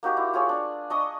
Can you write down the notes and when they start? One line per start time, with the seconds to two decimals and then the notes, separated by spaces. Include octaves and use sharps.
0.03 A#3 D#4 F#4 G4
0.17 E4
0.34 F4 G#4 C#5
0.49 D4
0.90 D4 D#5 C#6 D#6